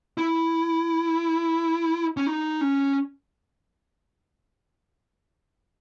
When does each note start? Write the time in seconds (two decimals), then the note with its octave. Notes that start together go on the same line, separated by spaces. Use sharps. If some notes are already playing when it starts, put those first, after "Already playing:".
0.18 E4
2.17 C#4
2.27 D#4
2.61 C#4